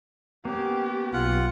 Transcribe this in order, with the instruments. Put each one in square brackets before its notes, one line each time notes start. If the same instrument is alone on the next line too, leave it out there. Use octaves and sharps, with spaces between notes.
[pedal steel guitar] A#3 B3 C#4 [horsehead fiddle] G4
[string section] B1 [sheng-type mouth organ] F4 F#5